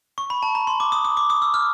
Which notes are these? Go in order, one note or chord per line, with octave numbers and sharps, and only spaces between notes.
C#6
B5
A5
A#5
C6
D6
D#6
D#6
D6
D#6
E6
F6